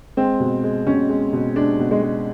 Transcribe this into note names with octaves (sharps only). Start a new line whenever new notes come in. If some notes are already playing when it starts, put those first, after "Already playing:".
G#3 C4
B2
G#3
B2 C#4
G#3
B2
G#3 D4
B2
G#3
G#3